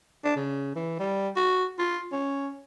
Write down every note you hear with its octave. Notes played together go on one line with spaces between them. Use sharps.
D4
C#3
E3
G3
F#4
F4
C#4